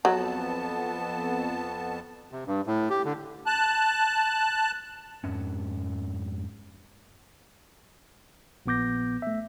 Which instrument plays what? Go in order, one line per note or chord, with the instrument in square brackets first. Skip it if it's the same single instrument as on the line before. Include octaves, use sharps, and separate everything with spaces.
[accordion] F2 B3 A5 [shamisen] F#3
[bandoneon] C3
G2
A2
G4
D3
[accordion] A5 F#6
[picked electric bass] F2 G#2 C#4
[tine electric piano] A#1 A#2 B3 D6 G6 A#6
A3 E5